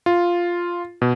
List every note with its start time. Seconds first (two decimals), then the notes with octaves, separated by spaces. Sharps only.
0.06 F4
1.02 B2